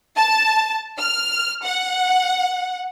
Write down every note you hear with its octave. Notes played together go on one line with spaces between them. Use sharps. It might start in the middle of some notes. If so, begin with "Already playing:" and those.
A5
F6
F#5